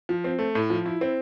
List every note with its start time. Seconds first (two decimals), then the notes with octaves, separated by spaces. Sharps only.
0.09 F3
0.24 C4
0.39 A3
0.55 A2
0.70 F3
0.86 E4
1.01 C4